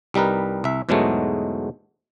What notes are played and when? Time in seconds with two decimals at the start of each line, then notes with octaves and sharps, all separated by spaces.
0.14 C2 G3 D#4 A#4 B4
0.64 C2 E5
0.89 E2 G#2 B2 F#3 G#3 A3